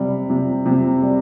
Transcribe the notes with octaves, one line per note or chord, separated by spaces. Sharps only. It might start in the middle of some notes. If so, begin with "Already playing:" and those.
Already playing: C3 G3
C3
C3
G3